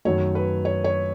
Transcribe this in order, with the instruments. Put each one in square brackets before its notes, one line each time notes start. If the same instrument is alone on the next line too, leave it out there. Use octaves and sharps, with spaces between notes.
[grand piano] F#2 D#3 F#3 A3 [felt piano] C#5
[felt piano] B4
C#5
C#5